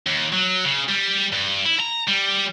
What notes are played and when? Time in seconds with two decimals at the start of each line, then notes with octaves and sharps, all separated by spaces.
0.06 D#2
0.32 F#3
0.65 C#3
0.89 G3
1.32 G2
1.66 E4
1.80 A#5
2.08 G3